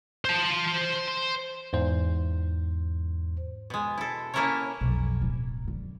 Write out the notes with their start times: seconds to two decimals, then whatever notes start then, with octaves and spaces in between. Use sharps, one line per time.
0.25 C5 A5
1.73 E2 G#2 C5
3.70 B2 G#3
3.98 E4 A4
4.34 A#3 C#4 E4 A4 A#4 C#5
4.81 B1 F2
5.22 D1
5.64 F#2 D3